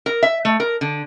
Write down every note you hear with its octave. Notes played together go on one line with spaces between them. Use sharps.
A#4
E5
A3
A#4
D3